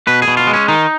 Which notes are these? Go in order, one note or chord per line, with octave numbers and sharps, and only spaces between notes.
B2 B4
G#4
B2
F4
G#3
C#4
D#3 D#4